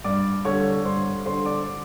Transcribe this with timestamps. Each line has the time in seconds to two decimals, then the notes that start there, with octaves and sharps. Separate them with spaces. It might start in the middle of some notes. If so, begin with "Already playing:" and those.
0.04 G2 D5 D6
0.45 D3 G3 C#5 C#6
0.85 G2 C5 C6
1.25 D3 G3 C5 C6
1.46 D5 D6